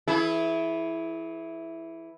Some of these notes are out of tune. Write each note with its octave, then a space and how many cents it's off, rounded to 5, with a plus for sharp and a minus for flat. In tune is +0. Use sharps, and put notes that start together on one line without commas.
E3 +0 E4 +0 G#4 +40